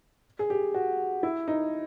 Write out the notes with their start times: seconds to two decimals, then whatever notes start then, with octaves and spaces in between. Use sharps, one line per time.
0.39 G#4
0.50 G4
0.74 F#4
1.23 E4
1.48 D#4